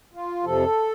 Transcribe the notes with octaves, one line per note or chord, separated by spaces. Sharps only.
F4
F2 C3 F3 A4